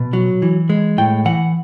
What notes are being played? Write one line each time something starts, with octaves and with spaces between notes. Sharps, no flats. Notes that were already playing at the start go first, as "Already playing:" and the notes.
Already playing: B2
F#3
E3
G#3
A2 G5
E3 F#5